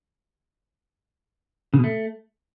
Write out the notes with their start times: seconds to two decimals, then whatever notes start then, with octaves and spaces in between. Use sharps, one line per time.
1.74 C#3
1.79 B2
1.84 A3